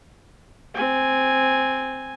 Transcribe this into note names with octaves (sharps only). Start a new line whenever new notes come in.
C4 G#5